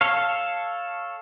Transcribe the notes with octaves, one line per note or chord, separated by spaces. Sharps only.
A4 C#5 F5